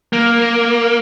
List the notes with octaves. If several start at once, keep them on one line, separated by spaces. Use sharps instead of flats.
A#3